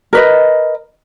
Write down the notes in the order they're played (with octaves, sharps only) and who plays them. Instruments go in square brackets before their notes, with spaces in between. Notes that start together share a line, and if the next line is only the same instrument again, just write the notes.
[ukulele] A#4 B4 D#5